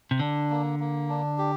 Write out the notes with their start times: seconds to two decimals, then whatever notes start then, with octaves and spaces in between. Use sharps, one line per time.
0.11 C3
0.20 D3 D4
0.50 A#3
0.79 A#3
1.09 D4
1.38 G4